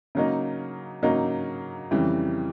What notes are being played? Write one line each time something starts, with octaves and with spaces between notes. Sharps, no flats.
C#3 F#3 A#3 D#4
C#3 F#3 A#3 D#4
F2 C#3 E3 G3